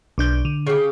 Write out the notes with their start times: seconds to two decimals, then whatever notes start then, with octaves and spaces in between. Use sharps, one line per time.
0.18 B1 D4 G6
0.45 D3
0.67 C#3 G4